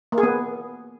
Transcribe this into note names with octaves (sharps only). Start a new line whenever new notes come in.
A#3
G#4
B3